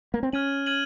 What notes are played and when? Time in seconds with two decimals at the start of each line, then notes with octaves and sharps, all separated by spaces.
0.14 A#3
0.23 C4
0.33 C#4 F6 G#6 D#7 F#7
0.66 F6 G#6 D#7 F#7